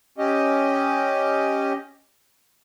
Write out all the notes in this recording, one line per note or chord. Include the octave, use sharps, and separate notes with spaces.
C#4 G4 D#5